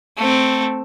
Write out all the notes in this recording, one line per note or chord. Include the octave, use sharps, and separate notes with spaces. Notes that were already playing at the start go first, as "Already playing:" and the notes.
A3 C4